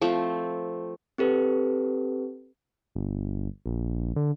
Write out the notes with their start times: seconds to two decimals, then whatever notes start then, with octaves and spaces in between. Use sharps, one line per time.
0.02 F3 A3 C4
1.18 C4 G4 A4 B4
2.95 G1
3.66 A#1
4.16 D3